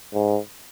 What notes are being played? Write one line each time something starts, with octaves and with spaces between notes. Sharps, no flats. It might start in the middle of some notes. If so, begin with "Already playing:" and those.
G#2